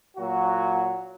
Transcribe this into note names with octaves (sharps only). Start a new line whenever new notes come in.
A#2 F#3 F#4